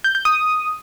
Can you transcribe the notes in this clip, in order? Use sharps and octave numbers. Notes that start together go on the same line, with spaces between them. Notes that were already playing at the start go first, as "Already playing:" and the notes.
G6
G6
D#6